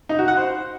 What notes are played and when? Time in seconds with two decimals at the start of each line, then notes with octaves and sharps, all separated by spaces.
0.09 D#4
0.19 F#4
0.28 F#5
0.37 C5